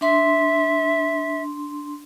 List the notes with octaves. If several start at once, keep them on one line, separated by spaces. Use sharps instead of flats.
D4 E5 C6